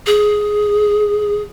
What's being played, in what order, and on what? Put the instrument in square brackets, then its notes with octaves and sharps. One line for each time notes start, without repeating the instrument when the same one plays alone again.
[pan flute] G#4